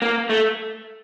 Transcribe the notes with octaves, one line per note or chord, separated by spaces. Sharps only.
A#3
A3